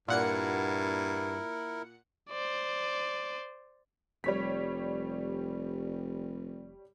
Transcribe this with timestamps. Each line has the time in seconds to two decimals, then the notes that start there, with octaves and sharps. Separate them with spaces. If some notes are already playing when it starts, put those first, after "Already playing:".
0.08 G2 A#2 E4 A#4 F#5 C#7
2.30 C5 D5
4.24 F1 G3 C#5 B6